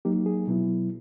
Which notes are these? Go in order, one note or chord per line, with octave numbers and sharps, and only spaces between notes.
F#3 A#3 D#4 G4
G#4
B2 F#3 B3 E4